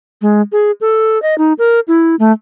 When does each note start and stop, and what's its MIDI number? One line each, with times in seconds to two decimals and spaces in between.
0.22 0.41 56
0.52 0.72 68
0.81 1.21 69
1.22 1.37 75
1.38 1.53 63
1.59 1.80 70
1.88 2.16 64
2.19 2.32 57